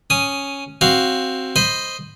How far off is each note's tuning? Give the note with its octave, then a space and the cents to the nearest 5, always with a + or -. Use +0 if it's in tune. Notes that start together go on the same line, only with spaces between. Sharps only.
C#4 +0 D#6 +0
C4 +10 F#4 +10 F5 +0
C5 +0 D#5 +0 B5 +10